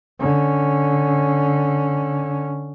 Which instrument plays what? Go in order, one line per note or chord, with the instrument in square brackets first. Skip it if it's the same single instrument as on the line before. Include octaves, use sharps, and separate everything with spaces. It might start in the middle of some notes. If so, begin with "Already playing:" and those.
[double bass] D3 C#4